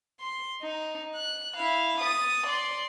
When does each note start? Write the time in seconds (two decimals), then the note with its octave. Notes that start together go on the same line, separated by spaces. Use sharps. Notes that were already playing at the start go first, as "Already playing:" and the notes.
0.21 C6
0.62 D#4
1.15 F#6
1.56 E4 F5
2.00 D#6 A6
2.47 D5 C6